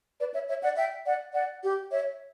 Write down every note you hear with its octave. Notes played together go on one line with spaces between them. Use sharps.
B4 D5
C#5 E5
C#5 E5
D5 F#5
E5 G5
D5 F#5
D5 F#5
G4
C#5 E5